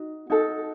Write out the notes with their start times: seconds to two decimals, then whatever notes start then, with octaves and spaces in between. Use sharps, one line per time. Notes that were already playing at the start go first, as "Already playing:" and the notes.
Already playing: D#4 F#4
0.30 D#4 F#4 A4